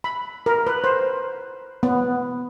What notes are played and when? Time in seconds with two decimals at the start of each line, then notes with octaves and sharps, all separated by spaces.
0.04 B5
0.46 A#4
0.67 B4
0.84 C5
1.83 B3